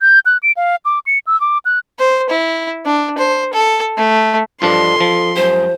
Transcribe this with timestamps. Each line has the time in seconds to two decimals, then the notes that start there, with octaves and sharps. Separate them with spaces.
0.02 G6
0.26 F#6
0.43 D7
0.57 F5
0.85 D6
1.07 C#7
1.27 E6
1.41 D6
1.65 F#6
1.99 C5
2.30 E4
2.86 D4
3.18 C5
3.53 A4
3.97 A3
4.62 G2 F3 D4 F4 A4 D#5 C6
5.01 F3
5.36 F#2 G4 C5